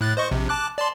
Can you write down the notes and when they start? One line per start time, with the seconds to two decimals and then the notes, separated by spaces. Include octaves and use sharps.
0.01 A2 F#6 A6
0.17 C5 D#5 C#6
0.31 A#1 C3
0.49 A5 D6 F#6
0.78 D5 A5 C6